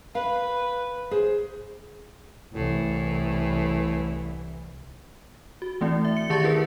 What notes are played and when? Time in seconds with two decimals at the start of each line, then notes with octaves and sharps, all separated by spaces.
0.15 B4 F5
1.11 G#4 C5
2.53 C2 A2 E3
5.62 F#4
5.81 E3 A3 C4 E4
6.05 E5
6.17 C#7
6.30 D#3 G4 D5 A5 C#6 A6
6.44 E4 G#4 A#4 B4